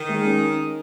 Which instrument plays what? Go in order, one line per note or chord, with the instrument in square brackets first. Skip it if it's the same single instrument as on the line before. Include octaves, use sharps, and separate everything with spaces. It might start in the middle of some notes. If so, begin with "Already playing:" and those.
Already playing: [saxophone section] D#3
[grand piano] G#3
C#4